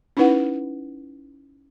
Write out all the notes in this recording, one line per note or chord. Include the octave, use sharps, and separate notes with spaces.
C#4 D#4 E4 B4 F#5